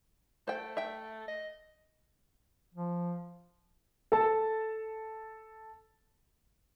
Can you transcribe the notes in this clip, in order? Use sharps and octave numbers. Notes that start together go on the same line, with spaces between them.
A3 C5 G5
E5 G5
D#5
F3
A4 A5